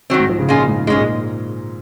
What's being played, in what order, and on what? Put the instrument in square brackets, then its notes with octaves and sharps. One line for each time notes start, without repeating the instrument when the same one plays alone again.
[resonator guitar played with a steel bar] D#3 F#3 C4
[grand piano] G#2
F3
C#3
[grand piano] A#2 [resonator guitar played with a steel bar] G#3 C#4 F4 G#4
[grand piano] G#2
[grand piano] G#2 [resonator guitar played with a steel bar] G#3 C#4 G#4
[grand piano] A#2